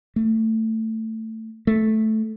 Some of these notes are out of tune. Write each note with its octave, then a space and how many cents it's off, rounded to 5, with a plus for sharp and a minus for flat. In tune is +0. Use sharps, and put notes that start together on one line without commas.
A3 +15
A3 -5